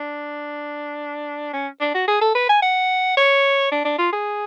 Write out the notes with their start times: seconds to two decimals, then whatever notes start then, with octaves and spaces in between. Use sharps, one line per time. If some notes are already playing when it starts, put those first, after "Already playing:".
Already playing: D4
1.53 C#4
1.80 D4
1.94 F#4
2.08 G#4
2.21 A4
2.35 B4
2.49 G#5
2.62 F#5
3.17 C#5
3.72 D4
3.85 D4
3.98 F4
4.12 G#4